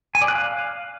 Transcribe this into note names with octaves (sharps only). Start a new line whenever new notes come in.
G#5
D5
F#6
F5